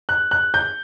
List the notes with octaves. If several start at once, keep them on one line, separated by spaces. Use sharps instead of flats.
F#6
F#6
G6